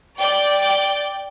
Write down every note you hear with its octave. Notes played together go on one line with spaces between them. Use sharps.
D5 G5